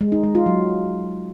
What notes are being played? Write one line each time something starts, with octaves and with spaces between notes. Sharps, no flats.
G#3
D#4
G#3
F4
F#3